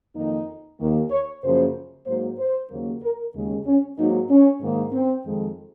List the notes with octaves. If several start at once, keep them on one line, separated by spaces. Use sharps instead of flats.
F2 D#3 A#3 D#4
D#2 D#3 A#3
C#5
F#2 C#3 F3 A#3 C5
G#2 F#3 A#3 C5
C5
D#2 C#3 F#3 A#3
A#4
D#2 C#3 G#3
C#4
G#2 F#3 A#3 D#4
C#4
G#2 D#3 A#3
C4
F2 D#3 G#3